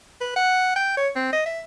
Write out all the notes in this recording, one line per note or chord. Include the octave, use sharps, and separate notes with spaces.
B4
F#5
G5
C#5
C4
D#5
E5